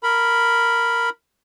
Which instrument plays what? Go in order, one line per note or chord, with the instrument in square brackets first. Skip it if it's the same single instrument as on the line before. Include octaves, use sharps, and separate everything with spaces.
[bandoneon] A#4 B5